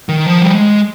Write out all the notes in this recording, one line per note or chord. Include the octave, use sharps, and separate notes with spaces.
D#3
F3
G3
G#3